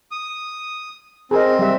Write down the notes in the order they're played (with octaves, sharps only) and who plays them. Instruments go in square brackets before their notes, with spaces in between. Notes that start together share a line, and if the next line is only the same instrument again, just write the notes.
[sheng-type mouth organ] D#6
[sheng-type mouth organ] C4 [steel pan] G#4 A#4 D#5
[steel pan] G3 E5